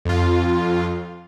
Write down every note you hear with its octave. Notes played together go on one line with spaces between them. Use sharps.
F2 F4